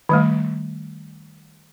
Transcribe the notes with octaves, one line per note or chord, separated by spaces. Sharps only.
D#3 G3 A3